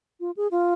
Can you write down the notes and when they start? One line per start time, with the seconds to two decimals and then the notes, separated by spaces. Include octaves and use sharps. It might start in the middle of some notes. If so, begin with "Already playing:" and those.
0.20 F4
0.37 G#4
0.51 F4